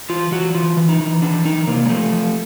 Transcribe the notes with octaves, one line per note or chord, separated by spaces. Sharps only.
E3 F4
E3 F#4
E3 F4
E3
D#4
E3
E3 D4
E3 D#4
C3 A#3
G#3
F3 A3
F3